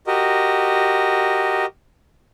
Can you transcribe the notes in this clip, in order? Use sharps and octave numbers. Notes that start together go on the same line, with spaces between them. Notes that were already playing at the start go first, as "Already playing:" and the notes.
F#4 G4 A#4 D#5